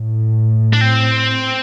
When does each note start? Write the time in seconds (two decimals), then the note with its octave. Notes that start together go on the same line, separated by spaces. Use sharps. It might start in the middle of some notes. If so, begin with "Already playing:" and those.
Already playing: A2
0.73 D4
0.81 C4